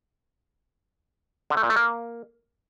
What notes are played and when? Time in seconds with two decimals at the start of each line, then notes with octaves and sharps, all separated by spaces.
1.50 D3
1.57 A3
1.63 A#2
1.70 A3
1.76 A#3